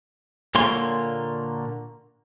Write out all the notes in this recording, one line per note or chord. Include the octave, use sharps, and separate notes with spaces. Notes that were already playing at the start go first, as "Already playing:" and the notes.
A#2 D3 A#3 C#5 C6